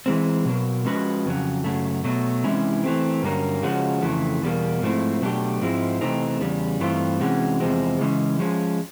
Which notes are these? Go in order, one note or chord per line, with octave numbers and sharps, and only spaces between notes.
E3 G#3 C4
B2 F#3 A#3
F3 G#3 C#4 F#4 B4
F2 C#3 F#3
F#2 C#3 F#3 A3
B2 F#3 A3
C3 E3 G#3 C#4 E4
E3 A3 C4
G2 D3 F#3 A#3 C#4
C#3 F3 G#3 C#4 F#4
F2 C#3 E3 A3
E2 B2 G3 A#3
G#2 F3 A3 C4 E4
B2 F#3 A3 D4 G4
G#2 F3 G#3 C4 E4
C3 E3 A3 C4 D#4
E2 C#3 G3
G2 E3 A3 C4 F4
C3 E3 G#3 C#4 F#4
E2 C3 F3 G#3 C4
C#3 E3 G#3 C#4
F3 G#3 C#4